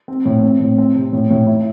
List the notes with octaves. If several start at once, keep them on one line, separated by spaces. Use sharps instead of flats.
C4
A2
C4
A2
C4
C3
A2
A2
E4